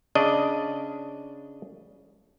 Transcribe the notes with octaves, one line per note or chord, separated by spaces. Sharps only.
C#3 D4 D5 D#5